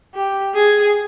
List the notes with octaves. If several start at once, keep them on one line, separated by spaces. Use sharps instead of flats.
G4
G#4